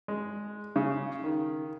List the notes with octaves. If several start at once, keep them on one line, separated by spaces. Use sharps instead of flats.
G#3
C#3
D#3